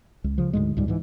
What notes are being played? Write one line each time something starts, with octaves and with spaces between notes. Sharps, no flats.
C#2
C#3 F3
D2 G#2 G#3
C#2 G#2 G3
G#2 E3